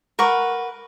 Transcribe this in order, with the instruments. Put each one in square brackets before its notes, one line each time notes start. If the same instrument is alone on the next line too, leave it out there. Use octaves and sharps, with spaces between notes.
[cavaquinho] A#4 B4 F#5 C#6